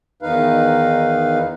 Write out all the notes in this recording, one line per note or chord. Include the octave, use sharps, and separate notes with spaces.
E2 D#3 D#4 B4 F5